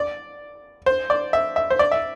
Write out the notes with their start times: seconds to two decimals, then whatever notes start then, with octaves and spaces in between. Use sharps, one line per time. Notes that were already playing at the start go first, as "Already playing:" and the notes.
Already playing: D5
0.86 C5
1.10 D5
1.33 E5
1.56 E5
1.70 C5
1.79 D5
1.92 E5